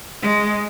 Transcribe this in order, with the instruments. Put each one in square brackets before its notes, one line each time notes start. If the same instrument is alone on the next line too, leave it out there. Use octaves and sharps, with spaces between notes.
[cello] G#3